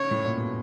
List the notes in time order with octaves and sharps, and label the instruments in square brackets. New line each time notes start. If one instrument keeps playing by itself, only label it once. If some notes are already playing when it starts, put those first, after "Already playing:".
Already playing: [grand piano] C#3 [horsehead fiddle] C#5
[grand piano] A2
A#2
B2